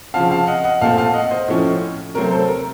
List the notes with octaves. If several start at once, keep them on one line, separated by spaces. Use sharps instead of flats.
C#3 F3 C4 F5 A5
F5 A5
D#5 F#5
D#5 F#5
A#2 A3 C4 F5 A5
F5 A5
D#5 F#5
C5 D#5
A2 F3 A3 C#4
C3 F#3 A3 C4 A#4
A4 C5
A#4